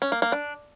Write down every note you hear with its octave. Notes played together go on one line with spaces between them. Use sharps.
C#4
A#3
A#3
D4